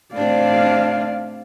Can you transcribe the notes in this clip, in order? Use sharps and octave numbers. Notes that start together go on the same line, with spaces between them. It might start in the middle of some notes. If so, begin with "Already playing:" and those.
A2 C3 D4 D5 F5